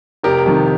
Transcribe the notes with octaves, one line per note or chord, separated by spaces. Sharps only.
F1 G4 A#4
F2 C3 D#3